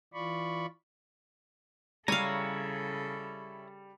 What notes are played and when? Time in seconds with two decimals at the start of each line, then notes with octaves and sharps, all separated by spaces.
0.14 E3 F4 D5 B5 C#6
2.08 C#3 G3 E4 A4 C#5 F5 G#5 A#5